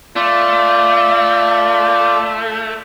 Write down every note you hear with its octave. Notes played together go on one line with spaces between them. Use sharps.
A3 F4 D5